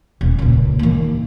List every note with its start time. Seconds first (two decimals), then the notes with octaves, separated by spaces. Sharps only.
0.21 D#1
0.39 C#2 A#2
0.79 D#3 A#3